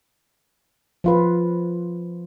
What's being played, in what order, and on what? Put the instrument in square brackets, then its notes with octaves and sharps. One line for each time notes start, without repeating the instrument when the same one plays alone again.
[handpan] F3 F4 B4